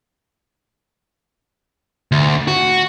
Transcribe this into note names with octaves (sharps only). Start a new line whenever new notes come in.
D2
F#4